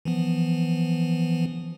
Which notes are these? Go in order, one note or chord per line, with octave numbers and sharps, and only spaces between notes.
E3 F3 B3